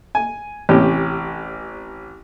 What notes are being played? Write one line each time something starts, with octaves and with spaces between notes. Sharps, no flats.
G#5
A1 C3 C#4 G4